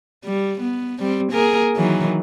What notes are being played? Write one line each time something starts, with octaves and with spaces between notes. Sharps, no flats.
G3
B3
G3 C4
A#3 G#4 A#4
D#3 E3 F#3